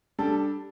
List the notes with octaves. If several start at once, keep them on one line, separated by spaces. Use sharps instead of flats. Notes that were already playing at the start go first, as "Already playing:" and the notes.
G3 D4 A4